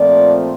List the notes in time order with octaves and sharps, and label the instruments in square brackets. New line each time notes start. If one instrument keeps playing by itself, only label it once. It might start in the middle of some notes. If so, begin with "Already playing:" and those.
Already playing: [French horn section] A#2 F3 A3 C4 D5